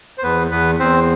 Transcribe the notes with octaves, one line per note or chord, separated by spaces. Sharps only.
C5
E2 B3 B4
E2 B3 B4
E2 C4 C5